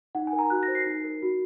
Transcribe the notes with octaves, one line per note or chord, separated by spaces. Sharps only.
D#4 F#5
G#5
A#4
A#5
F#4 F#6
A#6
C5
C7
D#4
A#4
F#4